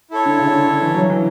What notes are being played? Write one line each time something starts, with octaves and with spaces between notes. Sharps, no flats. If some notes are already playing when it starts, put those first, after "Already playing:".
E4 A4 C#5
D3
C#3
D3
D3
E3
F#3
E3